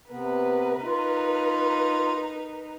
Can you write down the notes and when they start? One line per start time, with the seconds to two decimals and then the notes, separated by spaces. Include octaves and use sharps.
0.11 C3 B3 A#4 B4
0.84 D#4 F4